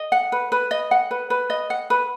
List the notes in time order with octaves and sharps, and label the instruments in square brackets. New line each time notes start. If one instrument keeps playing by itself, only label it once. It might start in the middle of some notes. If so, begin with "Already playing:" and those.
Already playing: [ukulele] D#5
F#5
B4
B4
D#5
F#5
B4
B4
D#5
F#5
B4